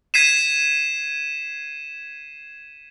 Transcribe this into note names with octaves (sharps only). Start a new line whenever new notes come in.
G#6 B6 C7 D#7 E7